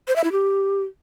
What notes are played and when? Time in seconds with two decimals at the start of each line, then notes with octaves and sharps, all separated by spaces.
0.08 C5
0.16 E5
0.24 E4
0.32 G4